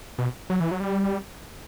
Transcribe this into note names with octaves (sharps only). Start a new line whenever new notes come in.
B2
F#3
E3
F#3
G3